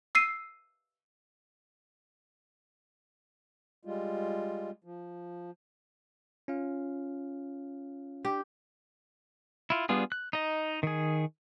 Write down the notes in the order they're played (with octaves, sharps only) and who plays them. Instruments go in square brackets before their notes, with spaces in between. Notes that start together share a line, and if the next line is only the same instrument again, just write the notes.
[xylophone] E6 C7 D#7
[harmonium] G3 G#3 F4
F3
[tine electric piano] C#4 F4 F5
[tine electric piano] D4 [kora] G4
[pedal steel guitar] E4 F4
G3 B3 D4 F4 G#4
F#6
D#4 D#5
D#3 G#4